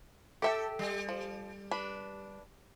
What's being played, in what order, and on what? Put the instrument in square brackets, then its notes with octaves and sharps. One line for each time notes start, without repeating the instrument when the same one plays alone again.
[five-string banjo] G4 E5 G5 [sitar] A4
[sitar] G3
[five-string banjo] F3
D4 B4